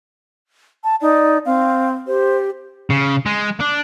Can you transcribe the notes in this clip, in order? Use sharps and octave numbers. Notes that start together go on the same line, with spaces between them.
A5
D#4 D5
C4 F5
G4 C5
C#3
G#3
D4